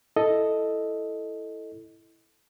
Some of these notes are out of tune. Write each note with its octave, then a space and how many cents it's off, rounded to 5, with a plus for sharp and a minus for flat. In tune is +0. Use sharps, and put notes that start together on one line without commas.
E4 +0 A4 +0 D#5 +0